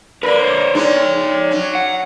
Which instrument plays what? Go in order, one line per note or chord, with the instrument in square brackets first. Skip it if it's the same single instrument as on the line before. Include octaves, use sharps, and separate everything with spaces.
[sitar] D3 A#3 [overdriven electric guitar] A#4 B4
[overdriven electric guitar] C5 C#5
[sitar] G#3 D4 [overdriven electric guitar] D#4 C#5
[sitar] F#3 C#4
[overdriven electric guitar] F#5